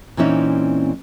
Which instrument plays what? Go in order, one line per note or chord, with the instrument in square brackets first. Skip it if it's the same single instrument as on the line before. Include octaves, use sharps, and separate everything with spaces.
[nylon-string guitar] A#2 E3 C4 C#4 D#4